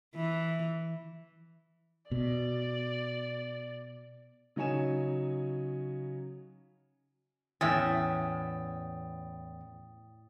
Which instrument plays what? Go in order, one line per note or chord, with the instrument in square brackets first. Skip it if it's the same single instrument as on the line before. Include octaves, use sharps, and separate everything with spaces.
[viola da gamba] E3
[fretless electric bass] B2 [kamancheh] D5
[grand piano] C#3 F#3 D#4 C#5 G#5 E7
[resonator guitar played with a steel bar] E2 C#4 [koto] A2 E5 [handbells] G5 D#6 A6